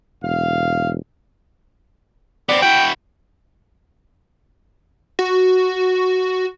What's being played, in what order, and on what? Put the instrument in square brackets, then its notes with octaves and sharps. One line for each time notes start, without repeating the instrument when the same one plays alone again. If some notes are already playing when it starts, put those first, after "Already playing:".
[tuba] E1 [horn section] F5
[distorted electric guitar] B3 C4 [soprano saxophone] D5
[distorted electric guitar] E4 F#4 [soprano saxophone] G5
[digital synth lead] F#4